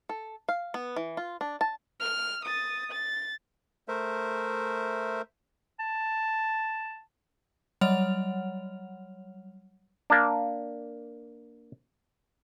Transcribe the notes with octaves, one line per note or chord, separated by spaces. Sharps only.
A4
F5
B3
E3
F4
D4
A5
F6
D#6 A6
A6
A3 A#4 C5 E5
A5
F#3 G3 C#5 F#5 F6 F7
A#3 D4